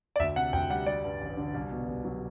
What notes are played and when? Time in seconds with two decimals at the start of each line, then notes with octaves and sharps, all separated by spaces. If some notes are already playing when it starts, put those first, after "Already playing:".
0.16 D5
0.19 D2 E5
0.36 C3 F#5
0.53 D2 G5
0.70 G3 F#5
0.86 G3 D5
1.04 G2
1.21 A1
1.37 D3
1.54 C2
1.71 B2
1.88 C2
2.05 F#3